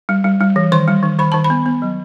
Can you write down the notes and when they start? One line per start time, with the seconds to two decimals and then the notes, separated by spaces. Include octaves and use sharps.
0.09 G3
0.24 G3
0.41 G3
0.56 E3
0.72 D#3 C6
0.88 G3
1.03 D#3
1.19 D#3 B5
1.32 D#3 A5
1.44 B5
1.50 B3
1.66 B3
1.82 F#3